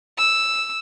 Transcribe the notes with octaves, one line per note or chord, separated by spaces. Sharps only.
E6